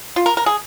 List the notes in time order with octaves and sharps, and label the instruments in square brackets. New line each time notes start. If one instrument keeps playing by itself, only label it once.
[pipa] F4
A#4
A#4
G#4